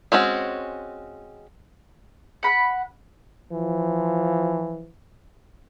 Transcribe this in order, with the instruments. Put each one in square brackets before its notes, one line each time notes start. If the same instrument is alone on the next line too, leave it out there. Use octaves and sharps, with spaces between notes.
[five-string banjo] G#3 C4 C#4 F#4
[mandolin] F#5 B5
[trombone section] E3 F3